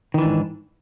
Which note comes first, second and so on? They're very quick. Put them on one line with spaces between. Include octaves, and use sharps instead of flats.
D#3 E3 D4 G#2